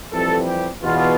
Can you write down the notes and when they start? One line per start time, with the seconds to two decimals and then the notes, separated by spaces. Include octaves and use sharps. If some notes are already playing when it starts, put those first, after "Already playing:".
0.12 F2 E3 G3 C4 A4
0.47 G4
0.83 E2 B2 B3 F4